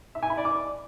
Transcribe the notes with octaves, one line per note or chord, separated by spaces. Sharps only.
E5
G#5
B5
D5
D6